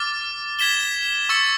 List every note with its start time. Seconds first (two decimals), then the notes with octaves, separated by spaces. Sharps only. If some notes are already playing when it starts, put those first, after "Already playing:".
Already playing: D6 F6 A6
0.59 G#6 B6 E7 G7
1.29 C#6 E6 A6 C#7